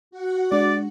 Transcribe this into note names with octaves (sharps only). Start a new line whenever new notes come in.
F#4 F#5
G#3 D4 D5